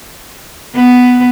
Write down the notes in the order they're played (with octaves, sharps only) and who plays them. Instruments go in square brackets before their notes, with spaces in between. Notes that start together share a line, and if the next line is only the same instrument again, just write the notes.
[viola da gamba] B3